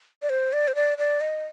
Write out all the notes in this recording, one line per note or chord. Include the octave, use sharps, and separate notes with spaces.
D5
C5
D5
C5
D5
D5
D#5